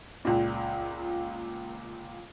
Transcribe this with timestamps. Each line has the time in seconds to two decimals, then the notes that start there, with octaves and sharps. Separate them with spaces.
0.25 C#2 A#2